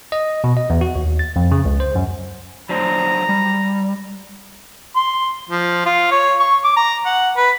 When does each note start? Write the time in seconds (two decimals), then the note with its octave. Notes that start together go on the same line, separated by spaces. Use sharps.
0.12 D#5
0.44 B2
0.57 D#5
0.70 E2
0.81 F#4
0.96 D#2
1.19 A6
1.36 F2
1.51 C#3
1.65 C#2
1.80 C5
1.95 F#2
2.69 F#3 D4 C5 A#5
3.29 G3
4.96 C6
5.49 F3
5.86 F4
6.11 C#5
6.40 C#6
6.64 D6
6.76 A#5
7.06 F#5
7.36 B4